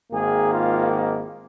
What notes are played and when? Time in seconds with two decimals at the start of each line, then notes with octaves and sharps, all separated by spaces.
0.11 G#1 G#2 D#3 A#3 G#4
0.53 F4